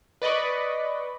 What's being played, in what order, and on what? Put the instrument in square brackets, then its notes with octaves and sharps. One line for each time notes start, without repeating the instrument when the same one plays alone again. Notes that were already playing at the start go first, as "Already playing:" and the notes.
[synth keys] B4 D5 D#5 B5 C#6